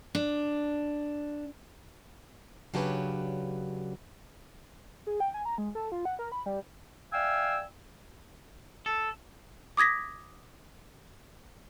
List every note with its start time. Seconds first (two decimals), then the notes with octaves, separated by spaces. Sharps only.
0.15 D4
2.74 C#3 F#3 D4 G4 B4 C#5
5.07 G#4
5.20 G5
5.34 G#5
5.45 A#5
5.58 G#3
5.75 A4
5.92 F4
6.05 F#5
6.19 A#4
6.32 B5
6.46 G3
7.13 D5 E5 F5 G5 G#5 E6
8.86 A4
9.77 D6 D#6 G#6 A#6 B6